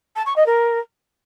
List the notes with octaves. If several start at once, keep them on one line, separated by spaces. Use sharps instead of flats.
A5
C#6
D#5
A#4